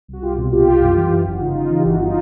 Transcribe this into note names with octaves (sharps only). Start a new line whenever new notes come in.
C2 F#4
C2 F4 G4
B2
C2 F4 G4
C2
F#2
E3
F#2
G1
F#4
C#3 D#4 F4
C#3
E3
G4
G1 F#4
D#4 F4